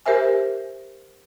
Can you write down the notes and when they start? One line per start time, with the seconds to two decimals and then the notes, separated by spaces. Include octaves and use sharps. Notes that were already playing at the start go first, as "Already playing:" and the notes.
0.06 G4 A#4 C5 E5 G#5